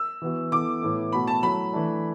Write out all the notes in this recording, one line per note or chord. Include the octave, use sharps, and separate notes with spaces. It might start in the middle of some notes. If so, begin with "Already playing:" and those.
Already playing: E6
E3 B3 F#4
E3 B3 E4 A4 D6
A2 E3 B3 E4 A4
B2 A3 F#4 A4 B5
A5
F#3 A3 E4 B5
E3 A3 D4